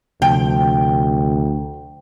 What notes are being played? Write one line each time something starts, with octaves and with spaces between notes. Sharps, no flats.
D2 C3 F3 G5